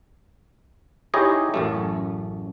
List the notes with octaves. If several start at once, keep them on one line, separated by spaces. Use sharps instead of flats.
D#4 E4 G4 G#4 C#5 D#5
A1 F#2 A3